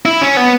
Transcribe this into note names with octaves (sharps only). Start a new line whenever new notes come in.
E4
C#4
B3